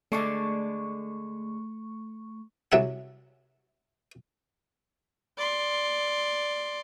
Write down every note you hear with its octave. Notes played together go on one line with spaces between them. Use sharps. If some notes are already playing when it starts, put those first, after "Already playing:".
D3 G#3 A3 D4 C#6
C2 F#3 G#4 E5 F#5
D5 C6